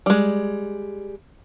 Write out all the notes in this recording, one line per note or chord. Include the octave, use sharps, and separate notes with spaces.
G3 G#3